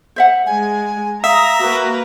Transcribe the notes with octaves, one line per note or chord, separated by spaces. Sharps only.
C5 E5 F#5
G#3 G#5
E5 F5 A#5 D#6
A#3 F#4 B4 A#5